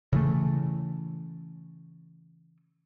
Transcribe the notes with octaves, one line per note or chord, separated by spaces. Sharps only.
C#3 E3 A3